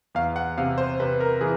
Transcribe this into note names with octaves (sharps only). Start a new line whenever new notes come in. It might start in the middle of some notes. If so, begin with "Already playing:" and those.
E2 F5
F#5
C3 F5
C5
C3 B4
A#4
E3 G#4